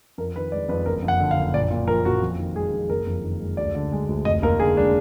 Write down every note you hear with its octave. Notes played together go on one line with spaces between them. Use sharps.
F2 A#4
D#3 B4
G#3 D5
F2 B4
F#1 A#4
F2
F#5
D3
F5
F#1
A#1 D5
A#2
F3 A#4
A#1 F#4
F2
D#3
G#3 G#4
F2
F#1 A#4
F2
D#3
G#3
D2 D5
D3
G#3
D2
F1 D#5
D#2 A#4
D3 G#4
G#3 D4